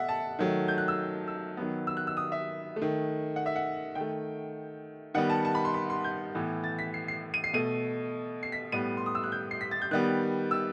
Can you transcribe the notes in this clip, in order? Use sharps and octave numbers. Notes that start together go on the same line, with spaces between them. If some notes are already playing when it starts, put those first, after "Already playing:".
Already playing: B2 A3 E5 F#5
A5
D#3 F#3 A3
G6
F#6
E6
E6
D#3 F#3 B3
E6
F#6
E6
D#6
E5
A3
D#3
F#5
E5
F#5
D#3 G5
A3
D#3 G3 B3 F#5
A5
A5
B5
C6
B5
C6
G6
A2 E3 B3
A6
B6
C7
C7
D#7
C7
B2 A3 D#7
C7
B6
A2 G3 B3 D#7
C6
D#6
E6
F#6
G6
C7
B6
A6
G6
D#3 G3 B3 F#6
E6